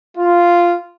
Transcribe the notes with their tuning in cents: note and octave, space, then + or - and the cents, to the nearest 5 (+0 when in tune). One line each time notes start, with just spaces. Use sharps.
F4 -5